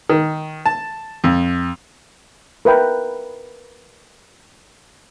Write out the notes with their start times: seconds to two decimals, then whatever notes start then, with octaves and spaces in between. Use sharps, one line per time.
0.10 D#3
0.66 A5
1.24 F2
2.65 A#4 B4 E5 G5